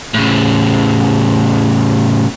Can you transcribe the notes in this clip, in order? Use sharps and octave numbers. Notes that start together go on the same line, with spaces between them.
A2 C#3